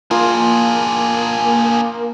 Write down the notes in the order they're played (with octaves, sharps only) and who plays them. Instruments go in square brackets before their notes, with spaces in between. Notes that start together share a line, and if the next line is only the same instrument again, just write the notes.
[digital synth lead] A#3 [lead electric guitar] D4 G#4 [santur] F4